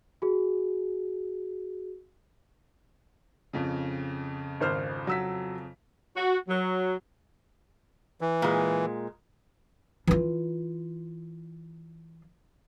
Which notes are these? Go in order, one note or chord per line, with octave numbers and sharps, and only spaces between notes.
F#4 G#4
F2 C#3
G#1 C5 F6
F#3 E6 B6
F#4
F#3
E3
A#2 G#3
E3 F4